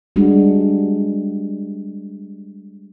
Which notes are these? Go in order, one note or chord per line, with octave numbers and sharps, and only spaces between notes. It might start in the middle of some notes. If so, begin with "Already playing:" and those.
G3 G#3 D4 F#4